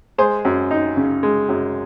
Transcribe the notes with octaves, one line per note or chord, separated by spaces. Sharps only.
G#3 G#4 C5
F#2
D#4
C#3
G#3
F#2